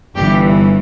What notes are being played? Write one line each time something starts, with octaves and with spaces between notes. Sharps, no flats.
G1 G2 E3 G4